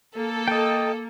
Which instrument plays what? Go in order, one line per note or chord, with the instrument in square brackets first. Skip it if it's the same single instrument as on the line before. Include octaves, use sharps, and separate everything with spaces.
[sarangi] A#3 [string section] A4
[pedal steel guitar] D#5 G5